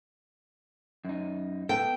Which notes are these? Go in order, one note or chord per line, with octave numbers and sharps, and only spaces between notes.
F#2 D#4
B3 A4 G5